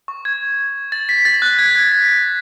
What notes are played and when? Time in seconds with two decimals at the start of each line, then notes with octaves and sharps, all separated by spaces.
0.08 C#6
0.25 G#6
0.92 A6
1.09 B6
1.25 A6
1.42 F#6
1.59 G#6
1.75 G#6
1.92 B6